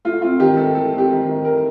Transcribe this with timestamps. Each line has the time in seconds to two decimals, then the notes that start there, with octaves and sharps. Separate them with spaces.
0.05 A3 F4
0.22 C4 F4
0.40 D#3 G4
0.57 D#3 A4
0.75 A3 A4
0.93 C4
0.98 G4
1.10 D#3
1.28 D#3
1.45 A3 A#4